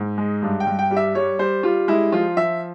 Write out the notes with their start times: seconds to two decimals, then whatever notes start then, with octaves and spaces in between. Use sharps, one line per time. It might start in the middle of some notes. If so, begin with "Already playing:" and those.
Already playing: G#2
0.17 G#3
0.42 G2
0.60 G5
0.67 G2
0.79 G5
0.91 G3
0.97 E5
1.15 G3 C#5
1.39 G3 C5
1.63 G3 F4
1.88 G#3 E4
2.12 F3 F4
2.37 F3 E5